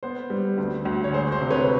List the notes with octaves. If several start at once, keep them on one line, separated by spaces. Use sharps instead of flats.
B3 C5
G3
D2
D2
C#5
G#3 C5
C5
C3
B4 C#5